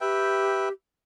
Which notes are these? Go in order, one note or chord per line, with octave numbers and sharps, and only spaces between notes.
G4 B4 E5 G5